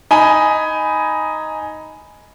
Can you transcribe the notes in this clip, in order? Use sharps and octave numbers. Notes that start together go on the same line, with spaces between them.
D#4 G#5 B5